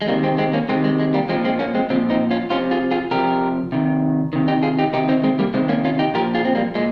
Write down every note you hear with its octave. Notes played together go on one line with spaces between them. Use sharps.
G#3
C3 D#3 G3 A#3
G#3 C4
G#3 C4
A#3 C#4
C3 D#3 G#3 C4
G#3
G#3
G3 A#3
A#2 F3 G#3 C4
G#3 C4
A#3 C#4
G#3 C4
A#2 F3 G#3 C4
C4 D#4
C#4 F4
C3 F3 C#4 F4
F4 G#4
F4 G#4
C3 F3 G4 A#4
C3 D#3
C3 D#3
D#4 G4
F4 G#4
D#4 G4
C3 D#3 D#4 G4
C4 D#4
G#3 C4
G3 A#3
C3 D#3 G#3 C4
A#3 C#4
C#4 F4
D#4 G4
A#2 F3 G4 A#4
F4 G#4
C4
G3 A#3
A#2 G#3